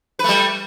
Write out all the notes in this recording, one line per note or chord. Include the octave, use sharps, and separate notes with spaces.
G3 A3 B4